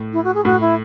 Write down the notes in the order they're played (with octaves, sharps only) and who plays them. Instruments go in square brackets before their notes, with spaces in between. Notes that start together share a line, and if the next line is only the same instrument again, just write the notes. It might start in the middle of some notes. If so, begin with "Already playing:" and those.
Already playing: [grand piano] A2
[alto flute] E4
F#4
G#4
[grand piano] A2 [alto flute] F#4
[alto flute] E4